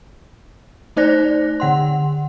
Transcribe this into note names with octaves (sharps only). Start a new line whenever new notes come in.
A3 D#4 C5 D5 F#6 A#6
D3 F#5 C6